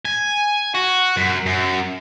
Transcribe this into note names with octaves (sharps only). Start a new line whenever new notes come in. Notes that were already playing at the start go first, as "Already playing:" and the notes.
G#5
F#4
F#2
F#2